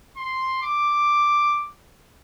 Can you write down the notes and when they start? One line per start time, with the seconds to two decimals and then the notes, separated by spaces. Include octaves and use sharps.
0.17 C6
0.63 D6